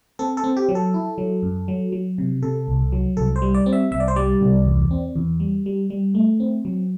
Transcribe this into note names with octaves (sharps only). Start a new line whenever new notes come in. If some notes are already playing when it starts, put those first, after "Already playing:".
C4 A4
A4
C4
G4
F#3
A4
E4
F#3
F#2
F#3
F#3
C3
C3 A4
C2
F#3
C2 A4
C5
G3
D5
C4
E5
C2 E5
D5
C5
G3 D5
C2
E2
C4
E2
G3
G3
G3
A3
C4
F#3